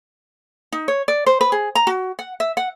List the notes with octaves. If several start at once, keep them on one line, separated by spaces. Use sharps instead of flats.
D#4
C#5
D5
C5
B4
G#4
A#5
F#4
F#5
E5
F#5